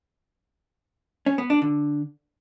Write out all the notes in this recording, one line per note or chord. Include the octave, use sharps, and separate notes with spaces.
C#4
B3
D4
D3